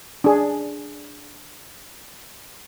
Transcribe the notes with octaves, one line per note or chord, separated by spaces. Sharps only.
D4 G#4